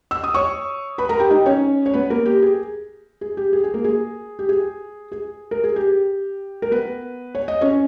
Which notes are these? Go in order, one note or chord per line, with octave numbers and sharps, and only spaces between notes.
E6
D#6
C#5 C#6
B4 B5
A#4 A#5
G4 G5
D#4 D#5
C#4 C#5
C#5
B3 B4
A#3 A#4
G4
G#4
G#4
G4
G#4
G#4
A#3 A#4
G#4
G4
G#4
G#4
A#4
G#4
G4
A#4
B3 B4
C#5
D#5
C#4 C#5